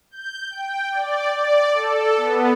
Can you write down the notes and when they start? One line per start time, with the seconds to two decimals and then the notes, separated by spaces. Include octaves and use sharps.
0.11 G6
0.50 G5
0.92 D5
1.37 D5
1.73 A4
2.17 B3